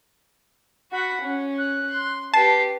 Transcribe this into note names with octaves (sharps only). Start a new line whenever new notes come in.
F#4 F#5 B5
C#4
F#6
C6
G4 B4 A5 C7